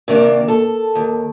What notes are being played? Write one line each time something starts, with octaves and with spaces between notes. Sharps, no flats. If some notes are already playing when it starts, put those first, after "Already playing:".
C3 D#3 A#3 D4
A4
D#2